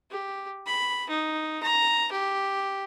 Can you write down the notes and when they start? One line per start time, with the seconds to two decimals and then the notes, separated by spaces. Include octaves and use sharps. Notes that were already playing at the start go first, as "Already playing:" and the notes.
0.11 G4
0.66 B5
1.09 D#4
1.63 A#5
2.12 G4